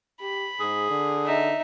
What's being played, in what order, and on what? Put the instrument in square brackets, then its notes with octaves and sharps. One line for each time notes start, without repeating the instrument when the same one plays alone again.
[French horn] G4 [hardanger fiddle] B5
[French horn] G#2 [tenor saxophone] G#4
[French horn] D3
[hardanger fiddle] D#4 E5